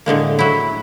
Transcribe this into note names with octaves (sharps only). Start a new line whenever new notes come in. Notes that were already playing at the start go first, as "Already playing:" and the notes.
A2 D3 G#3 A#3
F#3 E4